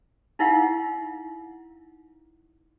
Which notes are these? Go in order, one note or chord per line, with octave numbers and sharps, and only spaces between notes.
D#4 E4 F5 F#5